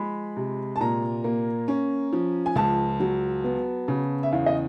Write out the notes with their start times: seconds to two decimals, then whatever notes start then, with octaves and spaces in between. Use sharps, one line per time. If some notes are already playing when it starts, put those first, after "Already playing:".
Already playing: F3 G#3 B5
0.36 C3
0.76 A5
0.81 A#2 A#5
1.24 A#3
1.68 C#4
2.13 F3
2.46 G#5
2.56 C#2 A5
3.00 F#3
3.44 B3
3.88 C#3
4.23 E5
4.32 E2 F5
4.46 D#5